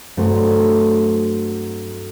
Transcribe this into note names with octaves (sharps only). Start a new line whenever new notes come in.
G2 F#3 A3 C4